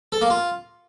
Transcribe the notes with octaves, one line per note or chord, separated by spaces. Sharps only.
A4
A#3
F4